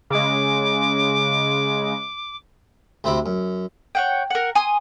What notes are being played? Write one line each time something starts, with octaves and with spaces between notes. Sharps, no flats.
C#3 G#3 D6
D2 C3 C5 E5 B5 D6
F#2
C#5 F#5 G5
A#4 F#5
G#5 C6 D#6